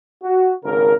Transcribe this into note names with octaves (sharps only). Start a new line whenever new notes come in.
F#4
G#1 C#3 A#4